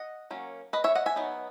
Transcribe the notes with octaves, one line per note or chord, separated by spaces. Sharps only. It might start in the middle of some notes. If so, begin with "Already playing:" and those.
Already playing: D#5 F#5
F#3 A#3 C#4
B4 D#5
C#5 E5
D#5 F#5
E5 G#5
F#3 B3 D#4